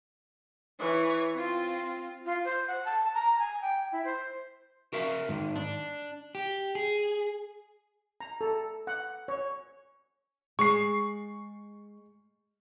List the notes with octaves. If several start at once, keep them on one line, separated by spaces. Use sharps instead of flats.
E3 C#5
C4 F4
F4
C5
F#5
A5
A#5
G#5
G5
E4
C5
F#4 A#4 E5 F5
G#2 D#3
D4
G4
G#4
A#5
A4
F#5
C#5
G#3 C#6 C7